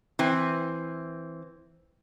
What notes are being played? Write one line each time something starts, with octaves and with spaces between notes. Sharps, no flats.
E3 C4